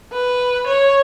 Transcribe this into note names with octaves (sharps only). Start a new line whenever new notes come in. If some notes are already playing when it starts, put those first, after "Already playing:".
B4
C#5